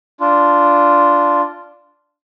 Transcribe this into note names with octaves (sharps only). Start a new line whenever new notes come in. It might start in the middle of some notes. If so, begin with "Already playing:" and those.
D4 F4